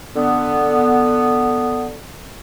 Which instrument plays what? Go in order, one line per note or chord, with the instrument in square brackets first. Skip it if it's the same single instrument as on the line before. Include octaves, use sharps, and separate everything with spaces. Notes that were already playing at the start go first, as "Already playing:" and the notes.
[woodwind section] D3 B3